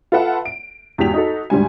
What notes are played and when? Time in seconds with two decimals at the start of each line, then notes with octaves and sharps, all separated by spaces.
0.12 F4 A4 B4 E5 F#5 A5
0.46 D7
0.98 E2 G#2 F#4 G4 B6 F7
1.14 D#4 F#4 A4
1.50 D2 G#2 G3 G#5